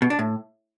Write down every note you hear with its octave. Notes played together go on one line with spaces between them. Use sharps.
B2
D4
A2